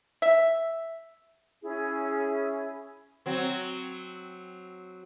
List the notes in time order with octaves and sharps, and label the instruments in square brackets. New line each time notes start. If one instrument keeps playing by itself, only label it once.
[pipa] E5
[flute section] C#4 E4 G#4
[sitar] F#3 C4